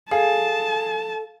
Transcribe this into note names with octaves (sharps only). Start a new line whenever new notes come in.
G#4 A4 F5 A5